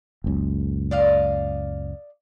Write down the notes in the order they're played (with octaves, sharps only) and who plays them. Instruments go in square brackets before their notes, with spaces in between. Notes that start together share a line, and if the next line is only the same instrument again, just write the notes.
[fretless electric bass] F#1 C#2
[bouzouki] D5 D#5 F5